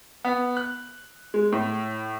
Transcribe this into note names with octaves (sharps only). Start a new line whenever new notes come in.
B3
F#6
G#3
A2